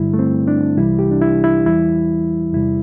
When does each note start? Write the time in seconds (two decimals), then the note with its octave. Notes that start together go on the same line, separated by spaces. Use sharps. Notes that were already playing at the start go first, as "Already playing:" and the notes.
Already playing: G2 D3 G3 E4
0.13 A3
0.19 C4
0.47 D4
0.77 C2 C3 E3 G3 E4
0.99 G4
1.11 D4
1.22 E4
1.44 E4
1.65 E2 E3 G3 E4
2.53 E2 C3 G3 E4